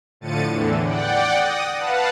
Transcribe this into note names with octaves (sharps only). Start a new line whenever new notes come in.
A2 D3 F3 A6 C#7 D#7
E2 A2 D3 E3
D5 F#5 G5
D#6 A#6
B4 F5 F#5 A5